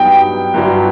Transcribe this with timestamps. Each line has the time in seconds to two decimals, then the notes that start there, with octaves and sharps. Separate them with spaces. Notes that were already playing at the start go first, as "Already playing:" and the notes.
Already playing: G2 F#3 B3 D#4 G4 G5
0.54 G1 G2 F#3